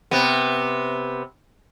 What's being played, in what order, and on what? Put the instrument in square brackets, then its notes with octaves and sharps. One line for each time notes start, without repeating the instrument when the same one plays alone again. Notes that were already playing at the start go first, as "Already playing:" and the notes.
[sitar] C3 B3